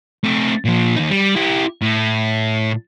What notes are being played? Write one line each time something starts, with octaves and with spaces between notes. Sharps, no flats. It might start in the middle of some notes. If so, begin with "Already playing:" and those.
A3 C4
A#2 F3
D#2 D#4
G3
E4 G4
A2